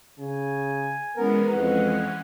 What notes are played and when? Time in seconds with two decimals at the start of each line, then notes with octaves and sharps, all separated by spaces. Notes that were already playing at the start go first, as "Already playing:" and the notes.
0.19 C#3 G#5
1.17 E3 G#3 B3 C#4 A#4 B4
1.50 F2 F#5